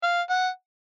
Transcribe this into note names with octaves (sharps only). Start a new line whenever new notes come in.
F5
F#5